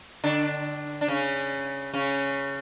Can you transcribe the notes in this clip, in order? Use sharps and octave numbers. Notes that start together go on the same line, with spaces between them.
D3 D4
D4
C#3 C#4
C#3 C#4